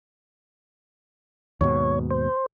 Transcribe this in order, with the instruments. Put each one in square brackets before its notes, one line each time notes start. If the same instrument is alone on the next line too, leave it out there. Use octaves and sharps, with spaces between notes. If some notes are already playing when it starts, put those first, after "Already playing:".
[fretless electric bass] D#2 G#2 B2 [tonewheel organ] C#5
[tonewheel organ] C5